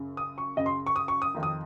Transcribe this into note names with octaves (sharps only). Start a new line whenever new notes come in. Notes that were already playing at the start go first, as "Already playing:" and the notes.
Already playing: F#2 C#3
D#6
C#6
F#2 C#3 D#5
C6
C#6
D#6
C#6
D#6
F2 D#3
D#6